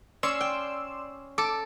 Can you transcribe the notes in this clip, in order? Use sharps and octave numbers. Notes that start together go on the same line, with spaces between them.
C#4 D5 C6 E6
G5
A4 D6